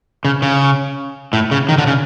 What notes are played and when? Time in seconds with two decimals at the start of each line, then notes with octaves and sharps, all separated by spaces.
0.25 C#3
0.42 C#3
1.33 A2
1.51 C#3
1.69 D#3
1.78 D3
1.87 C#3